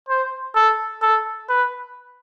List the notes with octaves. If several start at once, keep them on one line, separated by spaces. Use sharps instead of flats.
C5
A4
A4
B4